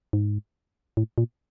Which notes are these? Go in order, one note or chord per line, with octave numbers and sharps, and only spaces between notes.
G#2
A2
A#2